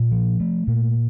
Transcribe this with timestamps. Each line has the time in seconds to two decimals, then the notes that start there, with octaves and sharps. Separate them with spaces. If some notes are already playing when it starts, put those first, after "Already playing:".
Already playing: A#2
0.12 F3
0.40 A3
0.67 A#2